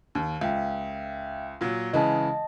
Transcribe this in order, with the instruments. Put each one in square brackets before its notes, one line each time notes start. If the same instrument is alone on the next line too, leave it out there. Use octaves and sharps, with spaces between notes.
[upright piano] D#2
[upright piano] C#2 [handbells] E5 F5 G5
[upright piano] A#2 F#3
[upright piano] C#3 E3 G#3 [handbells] D#5 A5